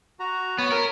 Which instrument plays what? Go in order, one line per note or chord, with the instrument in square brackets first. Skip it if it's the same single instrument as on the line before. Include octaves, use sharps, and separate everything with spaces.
[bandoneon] F#4 A#5
[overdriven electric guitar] B3 [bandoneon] C#5 B5
[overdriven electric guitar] A#4